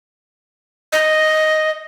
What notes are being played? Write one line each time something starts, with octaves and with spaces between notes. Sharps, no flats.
D#5